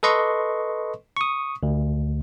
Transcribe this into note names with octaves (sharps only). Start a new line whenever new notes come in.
A4 B4 D#5 C6 C#6
C#6 D#6
D2